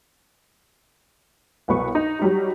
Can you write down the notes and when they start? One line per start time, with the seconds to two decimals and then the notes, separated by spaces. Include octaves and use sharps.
1.68 C2 B2 F#3 B4 C#6
1.95 D#4
2.19 F#3 G3 D#4